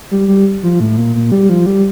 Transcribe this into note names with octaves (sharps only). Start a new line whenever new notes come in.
G3
G3
F3
A2
A#2
A#2
G3
F3
G3